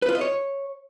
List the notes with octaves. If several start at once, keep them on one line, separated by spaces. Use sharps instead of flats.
B4
F4
D#5
C#5